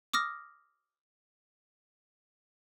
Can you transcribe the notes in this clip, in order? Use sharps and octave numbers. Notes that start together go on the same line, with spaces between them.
D6 D#6 F6 A#6